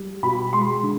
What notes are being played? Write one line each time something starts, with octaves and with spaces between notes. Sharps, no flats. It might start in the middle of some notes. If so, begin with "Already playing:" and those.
Already playing: G3
B2 B5
G#3 C6
D3